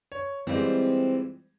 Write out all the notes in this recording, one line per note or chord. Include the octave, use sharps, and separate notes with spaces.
C#5
E3 G3 G#3 C4 F4